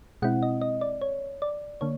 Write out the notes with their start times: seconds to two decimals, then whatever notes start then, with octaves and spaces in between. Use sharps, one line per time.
0.22 B2 G#3 C4 E4 F#5
0.43 D#5
0.62 D#5
0.81 D5
1.02 C#5
1.42 D5
1.81 D3 A#3 C#5